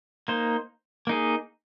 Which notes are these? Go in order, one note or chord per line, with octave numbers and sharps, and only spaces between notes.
A#3 D#4 C5
A#3 D#4 G#4